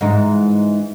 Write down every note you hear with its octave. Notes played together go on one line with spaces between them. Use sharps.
G#2 E3 D#4